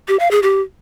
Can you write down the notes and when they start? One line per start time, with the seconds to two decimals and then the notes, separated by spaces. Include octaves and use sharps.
0.08 G4
0.20 F5
0.31 G#4
0.43 G4